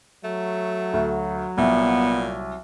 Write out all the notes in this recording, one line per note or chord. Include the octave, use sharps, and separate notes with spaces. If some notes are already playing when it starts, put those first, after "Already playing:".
F#3 A3
D2
C2 A#2 B3